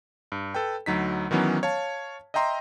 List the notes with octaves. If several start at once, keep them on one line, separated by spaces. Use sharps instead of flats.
G2
A4 B4 G5
D2 F#3 D#4 B6
D#3 E3 F#3 B3 C#4
C#5 F5 A5
D#5 E5 G5 A#5 C6